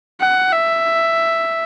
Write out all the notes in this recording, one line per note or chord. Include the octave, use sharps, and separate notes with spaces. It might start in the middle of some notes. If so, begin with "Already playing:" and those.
F#5
E5